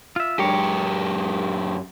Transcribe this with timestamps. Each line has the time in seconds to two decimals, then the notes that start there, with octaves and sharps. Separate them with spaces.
0.16 F4 E5
0.39 F#2 G#3 G4 A#4 C#5